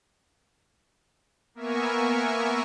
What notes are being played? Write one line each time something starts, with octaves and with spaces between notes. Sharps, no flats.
A#3 B3 A#4 E5 G#5 C#6